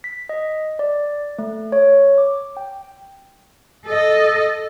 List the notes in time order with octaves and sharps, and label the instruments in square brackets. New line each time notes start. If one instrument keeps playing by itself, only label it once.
[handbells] B6
D#5
D5
A3
C#5
D6
G5
[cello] A4 D#5